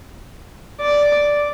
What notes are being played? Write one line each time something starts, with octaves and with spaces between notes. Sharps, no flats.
D5